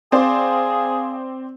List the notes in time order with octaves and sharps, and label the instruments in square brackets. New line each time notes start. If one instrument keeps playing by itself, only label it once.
[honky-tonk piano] C4 C5 D5 [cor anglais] G#4 [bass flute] F5